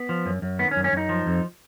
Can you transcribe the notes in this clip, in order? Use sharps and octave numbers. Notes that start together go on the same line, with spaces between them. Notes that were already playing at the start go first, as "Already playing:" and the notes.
Already playing: B3
F3
F#2
F#2
D#3 B3
C#4
F#2
C#4
F#2 D#4
F3
F2